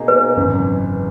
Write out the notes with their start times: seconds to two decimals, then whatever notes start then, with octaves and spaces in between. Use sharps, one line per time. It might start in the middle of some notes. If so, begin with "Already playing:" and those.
Already playing: B2 A#3 D#4 G#4
0.08 B4
0.37 G#1 F#2 C#3 E3